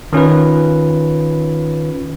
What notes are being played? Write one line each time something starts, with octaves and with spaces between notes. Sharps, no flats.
D#3 C#4 F4 B4